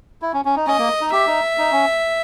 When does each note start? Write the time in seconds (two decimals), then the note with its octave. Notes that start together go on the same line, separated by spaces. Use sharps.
0.22 E4
0.33 C#4
0.45 C#4
0.56 D#4
0.67 C#4 D#5
0.78 A#3
1.01 D#4
1.12 G4 E5
1.27 D#4
1.58 D#4
1.72 C#4